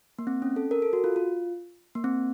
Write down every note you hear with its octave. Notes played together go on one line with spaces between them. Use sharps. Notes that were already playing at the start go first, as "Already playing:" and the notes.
A#3
C4
C#4
A4
A#4
A4
F#4
F4
F4
A#3
C4